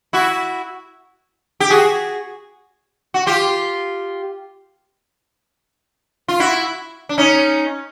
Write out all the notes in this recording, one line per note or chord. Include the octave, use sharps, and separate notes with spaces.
E4 F#4
G4
F#4 G#4
F#4
F4 G4
F4
E4 F#4
D4
C#4 D#4